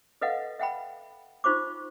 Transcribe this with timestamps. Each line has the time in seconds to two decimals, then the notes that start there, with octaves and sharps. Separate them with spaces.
0.21 A4 B4 D#5 F5 F#5
0.59 E5 F#5 G5 B5
1.44 D#4 F4 C5 C#6 D6